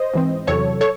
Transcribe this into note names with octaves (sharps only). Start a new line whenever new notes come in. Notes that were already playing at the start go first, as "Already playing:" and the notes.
Already playing: C5 D#5
G#2 E3 C4
E2 C3 F#3 A4 C#5
A4 C#5